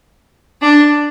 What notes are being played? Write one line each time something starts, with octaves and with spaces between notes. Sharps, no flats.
D4